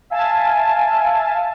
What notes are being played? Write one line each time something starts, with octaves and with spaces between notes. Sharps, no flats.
E5 F5 G#5 A5